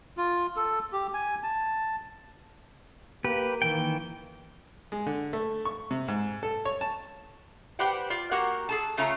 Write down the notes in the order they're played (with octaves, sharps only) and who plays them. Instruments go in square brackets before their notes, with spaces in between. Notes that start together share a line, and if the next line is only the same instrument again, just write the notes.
[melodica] F4
A4
G4
G#5
A5
[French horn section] A#3 [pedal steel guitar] G4 B4
[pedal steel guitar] D#3 E3 G5
[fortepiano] G#3
D3
A3
C#6
C3
G#2
A4
C#5
A5
[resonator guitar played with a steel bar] G4 B4 C5 D5 F#5 G5
F4 D5
A#3 F#4 G4 A#4 F#5
G#4 A4 A5
C#3 A3 C#4 F4 A#5